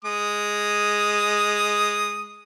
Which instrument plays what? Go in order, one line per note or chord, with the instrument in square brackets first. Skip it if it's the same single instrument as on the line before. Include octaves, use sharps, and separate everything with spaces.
[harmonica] G#3 D#6